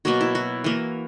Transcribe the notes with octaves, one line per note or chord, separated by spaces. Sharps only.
B2 F#3 A#3 F#4
E4
F#4
E3 A#3